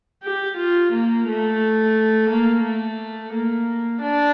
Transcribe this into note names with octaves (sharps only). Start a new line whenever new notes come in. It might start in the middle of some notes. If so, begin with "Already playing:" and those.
G4
F4
A#3
A3
A#3
A3
A#3
D4